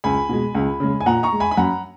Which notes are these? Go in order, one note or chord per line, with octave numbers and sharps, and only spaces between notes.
C#2 G#5 B5
B2 G#3
C#2
C#3 G#3
G#5
A#2 F#5 A#5
A#5 C#6
G#3
G#5 B5
B5
F#2 F#5 A#5